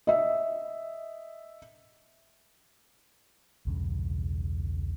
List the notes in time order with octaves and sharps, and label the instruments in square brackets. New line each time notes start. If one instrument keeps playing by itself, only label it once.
[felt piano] D#5 E5
[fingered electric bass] B1 E2 G2 C#3